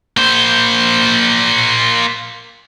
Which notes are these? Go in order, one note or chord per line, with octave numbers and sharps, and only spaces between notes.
A#3 C5